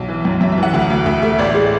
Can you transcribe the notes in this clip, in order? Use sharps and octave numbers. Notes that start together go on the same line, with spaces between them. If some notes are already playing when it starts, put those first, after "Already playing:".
Already playing: B1
E3
F#2
F#2 E5
E5
E3
F#5
D2 F#5
D2
D2 E5
A3 E5
A1 D5
G#3